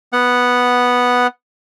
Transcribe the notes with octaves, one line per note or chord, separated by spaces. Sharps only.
B3 F#5